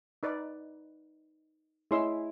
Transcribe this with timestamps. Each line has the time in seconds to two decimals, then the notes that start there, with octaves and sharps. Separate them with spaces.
0.23 D#4 B4 D5
1.91 A3 E4 G#4 C#5 D#5 C6 E6